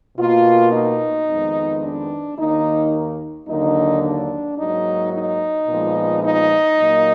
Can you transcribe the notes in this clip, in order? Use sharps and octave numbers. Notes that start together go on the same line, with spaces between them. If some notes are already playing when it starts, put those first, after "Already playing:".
B2 A#3 F4
D#4
F2 D#3 G#3 B3
D4
D#2 D#3 A#3 D#4
D#2 D3 F#3 A#3 D#4
D4
G#2 F#3 A#3 D#4
D#4
A#2 F3 G#3 B3
D#4
A#2 F#3 A#3